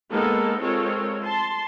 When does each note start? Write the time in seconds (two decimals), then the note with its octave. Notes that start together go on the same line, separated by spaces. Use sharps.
0.11 G#3 A#3 B3 D#4 A4 A#4
0.60 G#3 C4 F4 A4 A#4 C#5
1.22 A5 C6